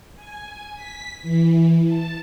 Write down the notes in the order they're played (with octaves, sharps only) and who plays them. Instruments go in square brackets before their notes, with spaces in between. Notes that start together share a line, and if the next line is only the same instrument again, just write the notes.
[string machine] G#5
B6
E3
A5